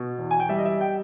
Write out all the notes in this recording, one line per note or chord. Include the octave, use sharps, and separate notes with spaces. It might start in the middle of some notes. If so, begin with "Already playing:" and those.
Already playing: B2
E2
G#5
G5
G3 E5
D#5
E5
G5